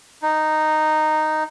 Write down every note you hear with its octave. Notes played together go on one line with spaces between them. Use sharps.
D#4